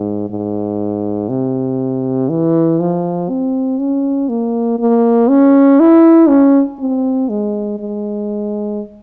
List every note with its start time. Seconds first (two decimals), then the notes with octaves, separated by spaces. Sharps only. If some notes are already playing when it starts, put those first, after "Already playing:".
Already playing: G#2
0.30 G#2
1.29 C3
2.29 E3
2.80 F3
3.30 C4
3.79 C#4
4.29 A#3
4.79 A#3
5.29 C#4
5.80 E4
6.29 C#4
6.79 C4
7.29 G#3
7.80 G#3